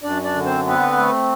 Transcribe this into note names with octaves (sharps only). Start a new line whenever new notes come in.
F#2 D4 D5
D4 D5
D3
C4 C5
B3 C4 B4
A3